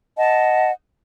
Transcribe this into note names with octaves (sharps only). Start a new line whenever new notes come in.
D#5 F#5 A5